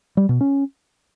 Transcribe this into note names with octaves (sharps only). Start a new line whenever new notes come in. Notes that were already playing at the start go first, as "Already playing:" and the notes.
G3
B2
C#4